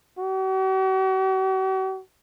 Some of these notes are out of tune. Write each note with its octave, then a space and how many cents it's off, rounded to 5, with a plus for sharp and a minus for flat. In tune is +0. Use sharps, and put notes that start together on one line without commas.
F#4 +45